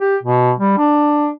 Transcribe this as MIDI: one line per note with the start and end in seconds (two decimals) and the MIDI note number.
0.01 0.17 67
0.23 0.52 47
0.59 0.76 55
0.78 1.30 62